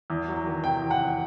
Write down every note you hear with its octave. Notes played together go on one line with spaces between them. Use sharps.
E2
F#3
D#3
C3 G5
E2
F#5
F#3